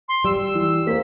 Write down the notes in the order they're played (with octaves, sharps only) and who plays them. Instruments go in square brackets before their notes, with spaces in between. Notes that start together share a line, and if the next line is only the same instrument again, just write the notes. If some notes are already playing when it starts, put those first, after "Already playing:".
[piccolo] C6
[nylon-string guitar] G3 [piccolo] E6
[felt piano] E3
[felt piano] A#3 C5 [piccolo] B6